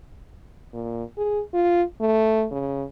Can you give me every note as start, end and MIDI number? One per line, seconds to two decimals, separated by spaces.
0.74 1.03 46
1.18 1.41 68
1.54 1.83 65
2.01 2.46 57
2.51 2.84 49